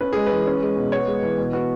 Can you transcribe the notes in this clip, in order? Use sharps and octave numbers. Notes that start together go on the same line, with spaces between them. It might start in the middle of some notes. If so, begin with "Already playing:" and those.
C#4 B4
G#3 G#4
B4
E3
C#4
G#3
B2
B3 C#5
G#3
E3
B2
B3 F#4